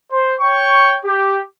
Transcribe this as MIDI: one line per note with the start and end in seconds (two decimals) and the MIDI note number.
0.11 0.34 72
0.40 0.95 73
0.40 0.95 79
0.40 0.95 85
1.05 1.38 67